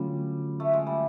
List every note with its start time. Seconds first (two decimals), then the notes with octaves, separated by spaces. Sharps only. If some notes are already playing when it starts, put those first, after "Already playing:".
Already playing: D3 F#3 G3 A3 C#4 F4
0.60 A3
0.73 G#3
0.87 G3